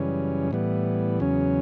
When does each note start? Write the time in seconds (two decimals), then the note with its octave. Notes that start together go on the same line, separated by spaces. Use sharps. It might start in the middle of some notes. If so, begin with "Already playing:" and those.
Already playing: F#2 C#3 E3 G3 C#4
0.51 A2 E3 G3 B3
1.20 E2 C#3 F#3 C#4